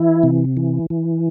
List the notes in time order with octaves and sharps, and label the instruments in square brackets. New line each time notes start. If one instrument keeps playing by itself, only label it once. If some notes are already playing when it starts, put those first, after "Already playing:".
Already playing: [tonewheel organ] E3 E4
C3
E3
E3